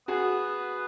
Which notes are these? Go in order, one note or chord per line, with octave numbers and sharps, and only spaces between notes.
B3 F#4 G#4